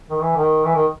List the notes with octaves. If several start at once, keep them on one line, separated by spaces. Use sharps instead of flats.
D#3
E3
D#3
E3
D#3